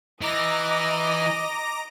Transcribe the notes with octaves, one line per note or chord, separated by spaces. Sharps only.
E3 D#5 A#5 D6 A#6